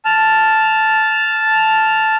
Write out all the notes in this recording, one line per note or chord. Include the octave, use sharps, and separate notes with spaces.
A5 F6